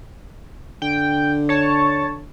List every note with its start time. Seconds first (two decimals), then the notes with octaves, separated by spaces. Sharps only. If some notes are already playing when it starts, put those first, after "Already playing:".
0.82 D3 G5
1.49 C#5 A5